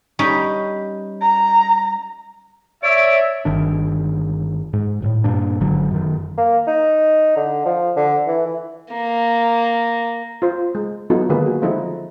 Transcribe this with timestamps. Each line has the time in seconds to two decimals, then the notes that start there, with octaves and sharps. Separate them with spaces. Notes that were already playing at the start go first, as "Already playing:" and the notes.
0.19 G3 C#4 D#4
1.21 A#5
2.83 C#5 D5 E5 D7
3.45 G1 D#3 D4
4.73 G#2
5.02 E1 A2
5.24 G2 A#2 D4
5.61 G#1 D3 F#3
5.91 F#2 D#3
6.38 A#3
6.67 D#4
7.37 D3
7.66 F3
7.96 D3
8.28 E3
8.46 E3
8.92 A#3
10.42 F4 C5
10.75 G#3
11.10 F#3 B3 D#4 F4 F#4 A4
11.29 D3 D#3 G#3 A#3 G#4 B4
11.46 F#4
11.62 F3 G#3 D#4 E4 A4